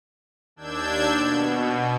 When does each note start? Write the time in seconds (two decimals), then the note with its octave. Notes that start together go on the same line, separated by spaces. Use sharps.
0.56 D#2 D4 E6 G6 G#6
1.16 B2